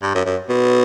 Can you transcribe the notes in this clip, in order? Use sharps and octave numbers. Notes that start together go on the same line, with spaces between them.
G2
F#2
F#2
B2